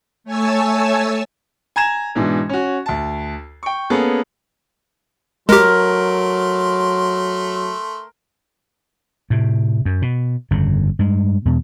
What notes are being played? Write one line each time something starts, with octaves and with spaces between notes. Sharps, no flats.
A3 C#5 G#5 A5 E6
G#5 A#5 G#6 E7
G#2 B2 E3 D4
C#4 F#4
D2 A5
G5 C#6
A#3 B3 C#4 G#4 A4
F#3 G#3 A3 G4 A#4 C6
A2 C3
F#2
B2
G1 F2 C#3
G2 G#3
E2 B2